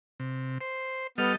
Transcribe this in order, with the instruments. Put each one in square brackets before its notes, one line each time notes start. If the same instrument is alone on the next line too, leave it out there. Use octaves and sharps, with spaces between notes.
[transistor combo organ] C3
C5
[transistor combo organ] G3 A4 D#5 [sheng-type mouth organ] B3 F6